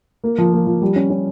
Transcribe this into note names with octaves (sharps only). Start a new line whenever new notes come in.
A#3
F3
A#3
F3
G3
C#4
C#4